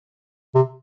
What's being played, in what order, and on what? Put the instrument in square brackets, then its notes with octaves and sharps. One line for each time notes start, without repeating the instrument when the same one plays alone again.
[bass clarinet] C3